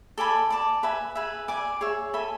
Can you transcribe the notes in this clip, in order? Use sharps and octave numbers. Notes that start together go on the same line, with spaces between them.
A4 D5 G#5 B5
D5 A5 D6
B4 E5 G#5
G#4 B4 E5
D5 G#5 D6
G#4 C#5 E5
A4 E5 G#5 B5